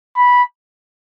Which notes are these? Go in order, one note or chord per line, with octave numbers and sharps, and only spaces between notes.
B5